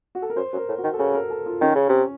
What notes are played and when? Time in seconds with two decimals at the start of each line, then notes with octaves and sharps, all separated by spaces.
0.15 F#4
0.22 A4
0.30 A#4
0.36 F#2 C5
0.52 F#2
0.57 A#4
0.68 A2
0.78 F#4
0.84 D#3
0.94 A4
0.99 C#3 A#4
1.14 A#4
1.30 A4
1.46 F4
1.61 D#3 C#4
1.75 C#3
1.89 C3